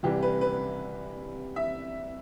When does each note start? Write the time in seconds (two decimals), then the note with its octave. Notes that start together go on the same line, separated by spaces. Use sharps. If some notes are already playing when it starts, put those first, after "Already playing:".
0.03 C2 C3 E3 G3 G4
0.22 B4
0.41 B4
1.56 E5